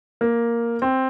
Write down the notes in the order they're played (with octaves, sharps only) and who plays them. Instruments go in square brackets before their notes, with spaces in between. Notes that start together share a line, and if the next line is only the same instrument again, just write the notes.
[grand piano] A#3
C4